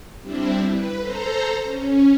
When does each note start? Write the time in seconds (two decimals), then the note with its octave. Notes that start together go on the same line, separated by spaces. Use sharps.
0.20 G3 C4 D4 E4
0.70 B4
1.00 A4 C5 A#5
1.64 C#4